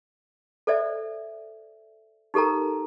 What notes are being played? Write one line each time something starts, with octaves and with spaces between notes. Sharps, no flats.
A4 C5 D5 E5
D#4 G4 A4 A#4 A#5